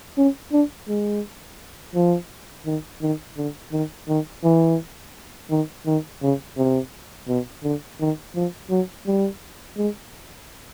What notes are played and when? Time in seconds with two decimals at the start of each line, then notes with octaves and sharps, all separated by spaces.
0.17 C#4
0.52 D4
0.88 G#3
1.95 F3
2.66 D#3
3.02 D#3
3.38 D3
3.72 D#3
4.08 D#3
4.44 E3
5.51 D#3
5.86 D#3
6.22 C#3
6.58 C3
7.28 B2
7.63 D3
8.00 D#3
8.35 F3
8.70 F#3
9.07 G3
9.78 G#3